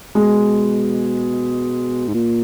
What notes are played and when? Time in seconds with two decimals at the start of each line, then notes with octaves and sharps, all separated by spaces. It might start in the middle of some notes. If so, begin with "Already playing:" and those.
0.15 B2 G#3
2.08 G#2
2.14 A#2